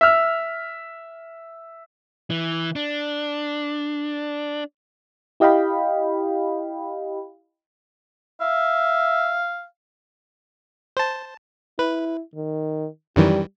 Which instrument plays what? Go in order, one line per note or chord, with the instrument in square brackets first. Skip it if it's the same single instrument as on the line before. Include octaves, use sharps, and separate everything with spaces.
[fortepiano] E5 F6
[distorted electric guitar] E3
D4
[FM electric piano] E4 G4 D#5 F5 G5 B5
[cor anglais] E5 [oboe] F5
[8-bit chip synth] C5 A5
[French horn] E4 [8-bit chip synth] B4
[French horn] D#3
[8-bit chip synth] F#2 D#3 E3 [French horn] G3